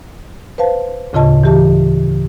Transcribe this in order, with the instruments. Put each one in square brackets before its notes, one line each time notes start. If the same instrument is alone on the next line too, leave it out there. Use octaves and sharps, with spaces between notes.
[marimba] B4 C5 F5 A5
D2 A2 C#3 F4 D#5 A5
E3 G4 A5